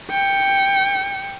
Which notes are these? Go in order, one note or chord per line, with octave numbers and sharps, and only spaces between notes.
G5 C#7